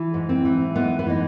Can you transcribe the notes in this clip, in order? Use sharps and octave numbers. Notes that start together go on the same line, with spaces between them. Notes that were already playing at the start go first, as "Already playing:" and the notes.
Already playing: E3
G#2
C4
E3
G#2 B3
B3
E3 D#4